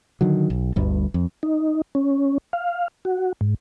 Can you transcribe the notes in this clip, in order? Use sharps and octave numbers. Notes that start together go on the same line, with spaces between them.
D3 D#3 F#3
B1
G1 D2 G2
F2
D#4
C#4
F5
F#4
G#2